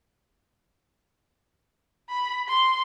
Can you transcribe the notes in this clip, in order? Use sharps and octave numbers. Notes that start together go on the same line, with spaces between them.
B5
C6